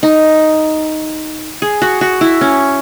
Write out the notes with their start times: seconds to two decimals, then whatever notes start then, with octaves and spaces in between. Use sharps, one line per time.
0.03 D#4
1.62 G#4
1.82 F#4
2.01 F#4
2.21 E4
2.41 C#4